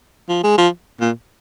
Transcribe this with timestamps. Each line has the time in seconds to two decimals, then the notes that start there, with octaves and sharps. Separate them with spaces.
0.29 F3
0.44 G#3
0.58 F3
1.01 A#2